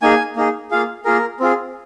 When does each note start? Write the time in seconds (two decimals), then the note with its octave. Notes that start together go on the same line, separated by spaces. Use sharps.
0.02 A#3 D#4 G#4 G#5
0.36 A#3 D#4 G#4
0.71 A#3 F4 G#4 F5
1.05 A#3 F4 G#4 A#4
1.40 C4 F4 G#4